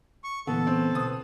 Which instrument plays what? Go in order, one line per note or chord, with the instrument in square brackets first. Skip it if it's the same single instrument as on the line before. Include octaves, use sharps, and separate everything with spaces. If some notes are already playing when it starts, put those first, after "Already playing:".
[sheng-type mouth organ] C#6
[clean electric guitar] D2 A#2 E3 [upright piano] B3 [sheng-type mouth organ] A4
[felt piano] C4
[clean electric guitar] B2 B4 C5 [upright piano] D#6